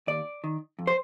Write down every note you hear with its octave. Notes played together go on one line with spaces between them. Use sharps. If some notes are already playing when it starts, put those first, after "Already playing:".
D#2 D5
D#3
F2
C5